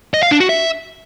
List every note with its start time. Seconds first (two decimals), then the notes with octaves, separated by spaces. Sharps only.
0.14 D#5
0.23 F5
0.32 D4
0.40 F#4
0.49 E5